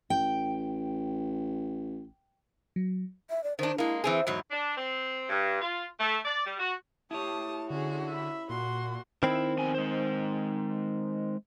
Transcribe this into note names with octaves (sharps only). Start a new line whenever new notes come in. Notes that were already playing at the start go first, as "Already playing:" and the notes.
A1 G5
F#3
E5
D5
D#3 D4 C5
G#3 A#3 E4
E3 C4 G#4 C5
E2 G#2 F#3
D4
C4
G2
F4
A3
D5
G3
F#4
E4 G4 C#5 A5 D#6
D3 C#4 F#4 G#4
E5 B5
A#2 F#4 C6
D#3 C4 E4
F2 B2 G#5
G#3 C5